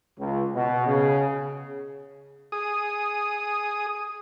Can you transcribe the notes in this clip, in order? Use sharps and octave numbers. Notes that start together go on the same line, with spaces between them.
C#2
B2
C#3
G#4 D#6